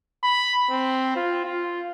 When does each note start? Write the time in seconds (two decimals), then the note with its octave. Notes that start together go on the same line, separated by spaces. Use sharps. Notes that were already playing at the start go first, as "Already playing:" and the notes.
0.23 B5
0.70 C4
1.16 F4
1.45 F4